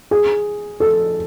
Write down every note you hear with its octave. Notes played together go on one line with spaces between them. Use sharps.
G#4
A4